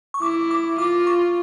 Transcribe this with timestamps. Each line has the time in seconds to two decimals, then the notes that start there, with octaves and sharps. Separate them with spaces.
0.14 C#6
0.22 E4 D6
0.51 D6
0.78 F4 D6
1.07 C#6